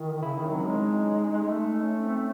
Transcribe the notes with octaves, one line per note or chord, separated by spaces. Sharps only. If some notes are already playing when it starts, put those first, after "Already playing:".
Already playing: D#3 E4
C#3 E4
D#3 D#4
C#4
F#3 C4
G#3 C#4
D#4
A3
C#4
C4